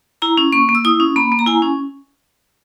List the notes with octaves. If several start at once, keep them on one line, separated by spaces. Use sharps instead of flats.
E4 A#5
C#4
A#3 C#6
A#3
E6
E4 D#6
C#4
A#3 B5
A#3
A#5
E4 G#5
C#4